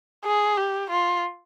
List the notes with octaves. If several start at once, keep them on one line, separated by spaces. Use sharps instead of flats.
G#4
G4
F4